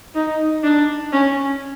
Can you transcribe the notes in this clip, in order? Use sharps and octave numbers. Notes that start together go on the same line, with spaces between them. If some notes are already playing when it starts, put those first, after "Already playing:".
D#4
D4
C#4